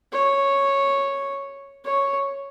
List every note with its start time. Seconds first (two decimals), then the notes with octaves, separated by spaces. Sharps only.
0.13 C#5
1.85 C#5